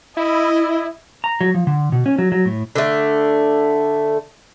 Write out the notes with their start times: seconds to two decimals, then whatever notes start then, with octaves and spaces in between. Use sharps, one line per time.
0.17 E4 D#5
1.24 A#5
1.41 F#3
1.54 F3
1.67 D3
1.92 B2
2.06 C#4
2.19 F#3
2.32 F#3
2.45 A2
2.75 D3 A3